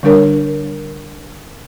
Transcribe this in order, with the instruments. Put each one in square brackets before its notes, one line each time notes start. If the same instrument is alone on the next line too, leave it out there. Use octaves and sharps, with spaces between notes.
[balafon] D3 G3 D4 A#4 C#5